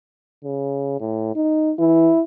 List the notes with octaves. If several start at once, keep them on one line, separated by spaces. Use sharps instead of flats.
C#3
A2
D#4
E3 E4